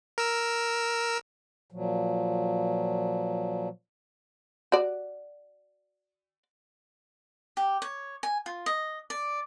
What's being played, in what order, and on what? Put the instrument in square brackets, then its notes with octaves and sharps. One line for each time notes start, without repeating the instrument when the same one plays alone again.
[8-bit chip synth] A#4 E6
[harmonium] A#2 F3 F#3
[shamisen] F#4 D5
[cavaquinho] G4
C#5
G#5
F4
D#5
D5